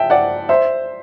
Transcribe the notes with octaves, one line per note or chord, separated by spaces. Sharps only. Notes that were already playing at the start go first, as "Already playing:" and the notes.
Already playing: E5 G5 A5
D5 F#5
C5 E5